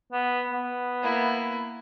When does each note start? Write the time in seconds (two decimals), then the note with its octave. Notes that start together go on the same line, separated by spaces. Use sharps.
0.12 B3
0.51 B3
1.02 A#3 E4